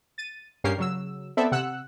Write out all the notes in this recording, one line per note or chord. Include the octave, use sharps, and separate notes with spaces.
A6 D#7
G2 A#3 C#4 G4 A#4 C7
C#3 F#3 E6
B3 C4 A4 D5 E5
C3 F#5 E6 F#6